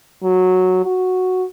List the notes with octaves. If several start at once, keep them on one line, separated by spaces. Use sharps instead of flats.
F#3
F#4